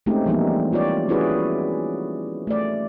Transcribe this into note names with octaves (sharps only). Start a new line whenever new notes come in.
G#3 A3 C4 C#4 D#4 G4
E3 F3 G3 A#3 B3 D#4
F4 G4 C#5 D5
C#4 E4 F#4 G#4 B4 D5
A3 D5